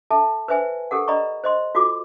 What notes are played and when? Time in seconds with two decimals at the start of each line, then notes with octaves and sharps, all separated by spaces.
0.11 A4 E5 A5
0.48 B4 C5 E5 G#5
0.91 G4 A4 A#4 F#5
1.08 D5 D#5 A#5 B5 C#6
1.44 C5 D#5 C6
1.75 F4 F#4 A4 D6